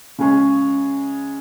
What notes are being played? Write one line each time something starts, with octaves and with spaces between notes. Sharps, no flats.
C#3 G#3 C#4 G#4